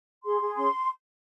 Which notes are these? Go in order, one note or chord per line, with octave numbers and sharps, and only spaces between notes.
G#4 C6
G#4
C#4 C6